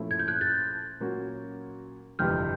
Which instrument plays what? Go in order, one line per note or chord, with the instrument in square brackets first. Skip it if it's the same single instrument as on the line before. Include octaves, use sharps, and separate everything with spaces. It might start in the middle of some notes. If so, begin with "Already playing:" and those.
Already playing: [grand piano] A#2 F3 A3 C#4 E4
[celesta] G#6
G6
F#6 G#6
G6 A6
[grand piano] A#2 F#3 A#3 C#4 F#4
[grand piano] G1 F2 C3 E3 G3 [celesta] F6 G6